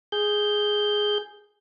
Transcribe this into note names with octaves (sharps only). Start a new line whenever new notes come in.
G#4 G6